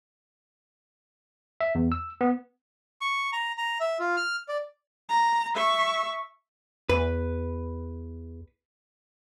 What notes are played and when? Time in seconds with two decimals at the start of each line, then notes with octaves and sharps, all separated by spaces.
1.61 E5
1.75 E2
1.92 E6
2.21 B3
3.01 C#6
3.33 A#5
3.58 A#5
3.80 E5
3.99 F4
4.17 F6
4.49 D5
5.09 A#5
5.55 E5 C#6
6.89 E2 B4